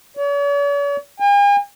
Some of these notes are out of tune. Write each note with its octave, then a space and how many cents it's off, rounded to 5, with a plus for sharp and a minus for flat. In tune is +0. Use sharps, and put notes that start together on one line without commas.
C#5 +45
G#5 -45